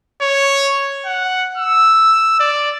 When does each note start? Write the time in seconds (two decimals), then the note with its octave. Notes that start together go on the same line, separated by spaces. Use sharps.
0.22 C#5
1.06 F#5
1.58 E6
2.39 D5